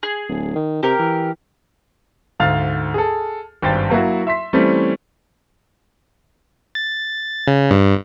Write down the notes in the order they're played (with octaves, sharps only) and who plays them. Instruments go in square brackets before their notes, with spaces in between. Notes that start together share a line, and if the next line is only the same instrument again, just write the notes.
[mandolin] G#4
[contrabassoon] D1
D#3
[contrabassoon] C3 [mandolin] G4 A#4
[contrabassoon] E3
[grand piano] D2 G#2 F5 F6 A6
G#4 A4
G#1 G2 C5 G5 A6
F#3 A#3 E4 F#4
E5 C6 B6
E3 G3 A3 C4 C#4
[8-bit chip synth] A6
C#3
G2